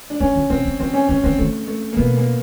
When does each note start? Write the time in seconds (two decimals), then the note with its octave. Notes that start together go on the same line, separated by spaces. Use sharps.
0.10 D4
0.20 F3 C#4
0.35 D#3
0.50 C3 C4
0.65 C#3
0.80 D3 C4
0.94 C#4
1.09 D#3 C#4
1.24 D#3 C4
1.38 D#3 A3
1.67 A3
1.93 A#3
1.97 B2 B3
2.18 A#3